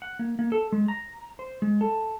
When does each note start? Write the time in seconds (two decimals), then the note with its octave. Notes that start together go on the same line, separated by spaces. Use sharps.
0.02 F#5
0.19 A#3
0.39 A#3
0.52 A4
0.72 G#3
0.88 A#5
1.39 C5
1.62 G#3
1.81 A4